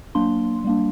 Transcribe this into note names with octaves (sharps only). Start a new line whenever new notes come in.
F#3 A#3 D4 C6
G3 A#3 D4